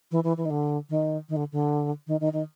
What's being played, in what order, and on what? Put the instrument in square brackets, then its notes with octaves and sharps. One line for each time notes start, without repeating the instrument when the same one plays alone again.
[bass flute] E3
E3
E3
D#3
D3
D#3
D#3
D3
D3
D#3
D#3
D#3